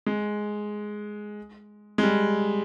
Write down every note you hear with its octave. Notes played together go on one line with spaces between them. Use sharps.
G#3
G#3
G3